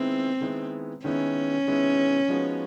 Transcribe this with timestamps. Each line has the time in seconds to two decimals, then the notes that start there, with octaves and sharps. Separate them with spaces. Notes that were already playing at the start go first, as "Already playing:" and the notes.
Already playing: D#3 G#3 B3 C4 E4
0.41 D#3 G#3 B3 E4
1.04 D#3 G#3 B3 C#4 E4
1.66 D#3 G#3 B3 E4
2.29 F3 G#3 B3 D#4 F#4